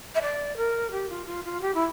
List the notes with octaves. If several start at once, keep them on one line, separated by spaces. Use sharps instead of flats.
E5
D5
A#4
G4
F4
F4
F4
G4
E4